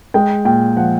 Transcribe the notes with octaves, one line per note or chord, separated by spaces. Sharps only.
G#3 G5
A#2 G5
F3 F#5